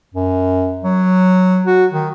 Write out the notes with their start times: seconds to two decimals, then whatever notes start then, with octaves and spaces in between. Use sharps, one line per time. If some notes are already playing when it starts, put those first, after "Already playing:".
0.15 F#2
0.84 F#3
1.67 F#4
1.92 D#3